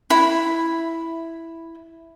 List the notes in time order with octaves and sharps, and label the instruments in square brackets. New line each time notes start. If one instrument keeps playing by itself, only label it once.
[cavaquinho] E4 B5